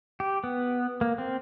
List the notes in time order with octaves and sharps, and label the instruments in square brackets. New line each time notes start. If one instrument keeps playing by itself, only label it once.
[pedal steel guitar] G4
B3
A#3
C4